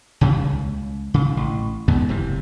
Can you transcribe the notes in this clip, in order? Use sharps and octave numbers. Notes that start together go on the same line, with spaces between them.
D#2 C#3 E3 G3
C#2
C#3
A1
E2 G#2 D3 B3
F#1 C3 E3